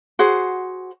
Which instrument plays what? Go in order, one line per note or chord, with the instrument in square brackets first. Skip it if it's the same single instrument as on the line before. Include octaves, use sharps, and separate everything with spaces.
[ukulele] F#4 G#4 C5 F#5